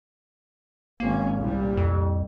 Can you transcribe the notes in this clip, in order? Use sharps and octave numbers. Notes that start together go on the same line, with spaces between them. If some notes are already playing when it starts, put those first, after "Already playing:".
G#1 A#3 C#4
C2 A#2 G3
F2